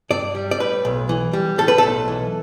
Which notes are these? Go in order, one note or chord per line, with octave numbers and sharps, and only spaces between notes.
G2 D5
G3
D5
A2 B4
B1
E3
G3
A2 A4
B4
B1 A4
E3